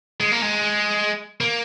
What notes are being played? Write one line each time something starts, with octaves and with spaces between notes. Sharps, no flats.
G#3
A#3
G#3
A#3